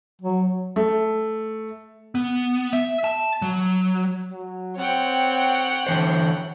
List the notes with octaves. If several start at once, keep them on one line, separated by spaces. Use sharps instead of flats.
F#3
A3
B3
E5
A5
F#3
F#3
C4 C#5 F#5 G5
D3 E3 C5